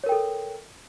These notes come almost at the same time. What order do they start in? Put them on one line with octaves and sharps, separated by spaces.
C#5 A#4 G5 A4